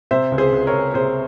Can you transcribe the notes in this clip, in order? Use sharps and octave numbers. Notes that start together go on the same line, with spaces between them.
C3 C5 E5
C#2
G#4 C5
C#2
A#4 C#5
C#2
C3 G#4 C5